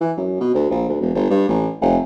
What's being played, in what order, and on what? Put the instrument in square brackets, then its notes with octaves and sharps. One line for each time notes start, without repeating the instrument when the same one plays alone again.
[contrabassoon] E3
F#2
B2
D2
A#1
D2
E1
G1
G2
A1
F1